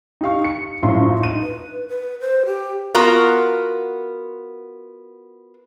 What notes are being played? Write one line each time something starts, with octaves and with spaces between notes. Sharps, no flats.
D#4 G4 F5 C#6
C#7
A#1 F#2 A2 F4 C6
D#4 D#7
B4
B4
C5
G4
B3 F4 F#4 A#4